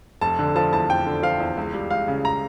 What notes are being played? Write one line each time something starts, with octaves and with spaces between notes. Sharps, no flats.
F1 A5
D3
F3 A5
E2 A5
F1 G5
D3
F3 F5
E2
C#2
G3
C#2 F5
C#3
A#5